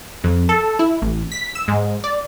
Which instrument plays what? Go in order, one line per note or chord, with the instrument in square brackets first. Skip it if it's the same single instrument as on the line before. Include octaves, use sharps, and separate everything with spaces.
[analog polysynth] F2
A4
E4
A1
B6
E6
G#2
D5